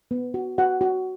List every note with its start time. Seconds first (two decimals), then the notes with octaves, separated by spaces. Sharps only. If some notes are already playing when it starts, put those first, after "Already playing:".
0.11 B3
0.34 F#4
0.58 F#4 F#5
0.81 F#4